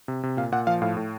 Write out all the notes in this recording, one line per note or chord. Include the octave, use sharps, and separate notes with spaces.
C3
C3
A#2 F5
A#2 F#5
F3 F5
A2 F5
A2